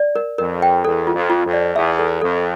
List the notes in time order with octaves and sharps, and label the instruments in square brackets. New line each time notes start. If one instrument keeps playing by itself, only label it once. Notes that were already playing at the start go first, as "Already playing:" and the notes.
Already playing: [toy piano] D5
A#4
[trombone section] F2 [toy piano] A#4
[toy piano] G5
[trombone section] E2 [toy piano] A4
[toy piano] F4
[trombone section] F2
[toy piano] F4
[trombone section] F2
[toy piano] D5
[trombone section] E2 [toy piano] E5
[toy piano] A4
[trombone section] F2 [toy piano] A4